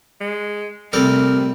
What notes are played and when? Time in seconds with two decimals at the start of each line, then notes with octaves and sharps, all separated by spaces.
0.21 G#3
0.93 C3 G3 A3 C4 A4 A#4